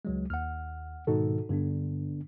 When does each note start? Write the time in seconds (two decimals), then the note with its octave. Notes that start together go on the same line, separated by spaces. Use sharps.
0.05 C#2 F#3 G#3
0.30 D#2 F#5 F6
1.07 G#2 B2 D#3 D#4 F#4 A4
1.49 G2 D3 B3 D4